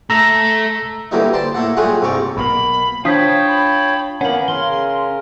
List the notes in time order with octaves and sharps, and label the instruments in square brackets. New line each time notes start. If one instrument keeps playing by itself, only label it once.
[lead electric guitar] A3 A4 [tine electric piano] A#5 E6 A#6
[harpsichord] D3 E3 F#3 G3 A#3 D#4
C5 D5 A5 C6
A2 A#3 A4 F#5
F#3 G3 A3 F4 G#4 F#5
C2 G#2 C3 C#5 D5
[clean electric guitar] B1 B2 A#3 [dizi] B5
[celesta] D4 D#6 B6 [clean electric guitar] F4 [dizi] C5 [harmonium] C#5 G5 A5
[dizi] B5
[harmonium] A#3 B3 [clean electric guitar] C#4 [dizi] A#4 [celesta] F#5 F#7
[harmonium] C#3 A#4 [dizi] C6 [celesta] G7